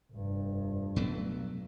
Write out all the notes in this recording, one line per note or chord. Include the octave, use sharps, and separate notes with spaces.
F1 G2
B2 F#3 A3